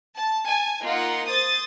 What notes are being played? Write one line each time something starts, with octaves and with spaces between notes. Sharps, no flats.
A5
G#5 A5
A#3 D#4 F4 F#5
C5 D#6 A6